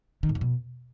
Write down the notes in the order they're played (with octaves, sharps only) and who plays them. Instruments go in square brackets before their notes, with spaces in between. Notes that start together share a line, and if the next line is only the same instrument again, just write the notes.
[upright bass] D#3
A2
F2
B2